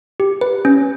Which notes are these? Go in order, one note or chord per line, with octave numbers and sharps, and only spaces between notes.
G4
B4
C#4